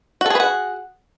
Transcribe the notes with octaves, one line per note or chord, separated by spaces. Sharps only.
F#4 G#4 A4 B4 F#5